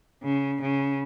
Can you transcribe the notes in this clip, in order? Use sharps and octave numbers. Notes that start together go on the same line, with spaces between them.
C#3
C#3